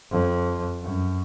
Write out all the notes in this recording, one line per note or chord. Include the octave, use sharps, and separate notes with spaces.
F2
F#2